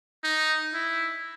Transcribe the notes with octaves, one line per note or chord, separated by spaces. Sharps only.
D#4
E4